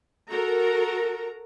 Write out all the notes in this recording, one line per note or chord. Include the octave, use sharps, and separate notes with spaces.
F#4 A4 A#4 A#5